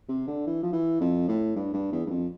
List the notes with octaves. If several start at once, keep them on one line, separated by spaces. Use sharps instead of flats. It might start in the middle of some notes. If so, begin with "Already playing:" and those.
C3
D3
E3
F3
E3
F2
A2
G2
G2
E2
G2
F2